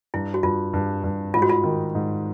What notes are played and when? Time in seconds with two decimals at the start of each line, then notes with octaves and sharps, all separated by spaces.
0.14 G2 E4
0.34 F#4
0.43 G2 F4
0.74 G2
1.04 G2
1.34 G#2 F4
1.42 F#4
1.49 F4
1.64 D#3
1.95 G#2